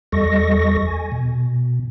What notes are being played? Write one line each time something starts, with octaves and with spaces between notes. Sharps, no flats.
E2 G3 A4 D#5 C#6 A#6
G#5
B2